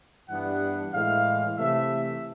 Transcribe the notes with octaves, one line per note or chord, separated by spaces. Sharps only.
G2 E3 G3 B3 D4 F#5
A2 E3 G#3 F5
C3 E3 A3 E5